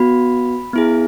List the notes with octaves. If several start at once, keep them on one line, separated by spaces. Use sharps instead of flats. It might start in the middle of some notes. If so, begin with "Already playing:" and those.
Already playing: B3 F#4 B5
B3 E4 G#4